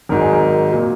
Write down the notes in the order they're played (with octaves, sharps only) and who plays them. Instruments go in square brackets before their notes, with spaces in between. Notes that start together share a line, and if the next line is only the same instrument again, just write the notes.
[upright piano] G#1 G#2 F#3 A#4
G#4
A#4
A#2 F#3 A#4